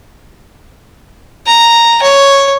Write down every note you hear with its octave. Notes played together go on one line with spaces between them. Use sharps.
A#5
C#5